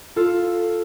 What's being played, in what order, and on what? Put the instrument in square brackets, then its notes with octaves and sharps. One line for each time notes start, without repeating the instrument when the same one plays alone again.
[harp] F4 A4